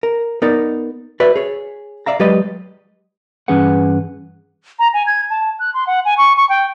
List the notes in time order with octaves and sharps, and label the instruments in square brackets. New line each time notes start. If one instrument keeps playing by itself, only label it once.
[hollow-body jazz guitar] A#4
B3 D#4 A#4 D5
F#4 B4 D5 E5
G#4 C#5
D5 E5 F5 A#5
F#3 G#3 G4 B4 D5 D#5
[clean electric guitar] G2 E3 C#4 G#4 B4 F#5
[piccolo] A#5
G#5
G#6
A5
F#6
C6
F#5
G#5
C#6
C#6
G5